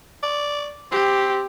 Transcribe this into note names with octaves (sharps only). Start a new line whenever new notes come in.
D5
C4 G4